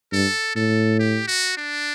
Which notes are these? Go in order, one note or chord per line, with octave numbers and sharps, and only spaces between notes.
G2 A4
A2 A4
G4
F#4
D4